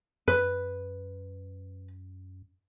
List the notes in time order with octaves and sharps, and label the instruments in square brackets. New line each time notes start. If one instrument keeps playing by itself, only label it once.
[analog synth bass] F#2 [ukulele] B4